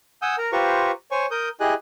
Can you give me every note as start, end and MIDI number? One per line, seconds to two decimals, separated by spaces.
0.22 0.36 78
0.22 0.36 80
0.22 0.36 87
0.22 0.36 88
0.22 0.36 91
0.38 0.51 70
0.38 0.51 82
0.52 0.92 65
0.52 0.92 67
0.52 0.92 71
0.52 0.92 72
0.52 0.92 82
0.52 0.92 85
1.11 1.26 72
1.11 1.26 73
1.11 1.26 80
1.11 1.26 85
1.31 1.49 70
1.31 1.49 87
1.31 1.49 91
1.60 1.74 64
1.60 1.74 67
1.60 1.74 68
1.60 1.74 75
1.60 1.74 80
1.60 1.74 90